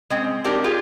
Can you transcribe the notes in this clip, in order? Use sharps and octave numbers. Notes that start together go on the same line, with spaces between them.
G#3 C4 C#4
C4 D4 D#4 G4 A#4
F4 G4 G#4